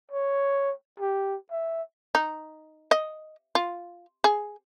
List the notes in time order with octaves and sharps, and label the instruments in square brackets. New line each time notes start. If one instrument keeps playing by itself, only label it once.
[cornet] C#5
G4
E5
[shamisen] D#4
D#5
F4
G#4